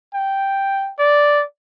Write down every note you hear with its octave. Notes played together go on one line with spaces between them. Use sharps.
G5
D5